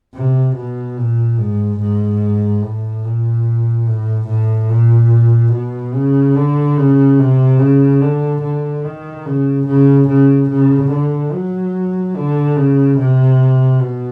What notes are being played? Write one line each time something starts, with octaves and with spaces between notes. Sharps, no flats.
C3
B2
A#2
G#2
G#2
A2
A#2
A2
A2
A#2
B2
C#3
D3
C#3
C3
C#3
D3
D3
D#3
C#3
C#3
C#3
C#3
D3
F#3
D3
C#3
C3
B2